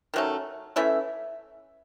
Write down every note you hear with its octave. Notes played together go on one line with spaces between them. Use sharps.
D#3 F#3 A3 C#4
E3 A3 C#4 E4 E5